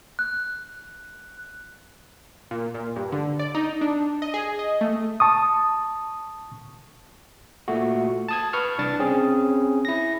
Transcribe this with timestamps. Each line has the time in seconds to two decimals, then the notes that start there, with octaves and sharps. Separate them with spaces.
0.19 F#6
2.51 A#2
2.74 A#2
2.96 G2
3.12 D3
3.39 D5
3.55 D#4
3.81 D4
4.22 D#5
4.34 G#4
4.59 D#5
4.81 A3
5.20 A5 C#6 D#6
7.68 A#2 A3 F#4
8.28 A5 D#6 G#6
8.53 B4 C#6 F6
8.78 C2 D4 A5 A6
9.00 C4 C#4 G#4
9.85 E4 A#6